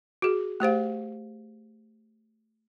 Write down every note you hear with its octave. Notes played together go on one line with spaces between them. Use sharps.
F#4 G#4
A3 G4 C5 F5